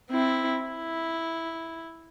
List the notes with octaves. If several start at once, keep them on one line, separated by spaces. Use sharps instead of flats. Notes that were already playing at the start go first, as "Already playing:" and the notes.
C4 E4
E4